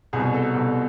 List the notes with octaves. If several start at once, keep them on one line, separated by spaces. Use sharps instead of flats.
C2 B2 G#4
A4
C2 B2